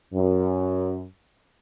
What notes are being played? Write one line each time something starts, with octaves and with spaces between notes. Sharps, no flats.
F#2